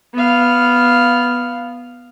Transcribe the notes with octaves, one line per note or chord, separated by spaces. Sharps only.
B3 F5